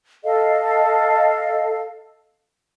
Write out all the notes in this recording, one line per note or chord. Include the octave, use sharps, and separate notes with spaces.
A4 D#5 F5